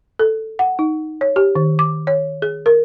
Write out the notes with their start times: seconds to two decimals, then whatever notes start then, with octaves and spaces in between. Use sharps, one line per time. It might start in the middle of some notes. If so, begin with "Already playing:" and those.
0.19 A4
0.59 F#5
0.79 D#4
1.21 C#5
1.36 G4
1.55 D#3
1.79 D6
2.07 C#5
2.42 G#4
2.66 A#4